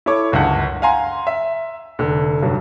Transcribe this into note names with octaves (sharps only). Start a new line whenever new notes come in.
E4 A4 C#5 D6
G1 C#2 F#2 F#5 A5
F5 F#5 G#5 A#5 C6
E5
F1 D3
F1 G2 F#3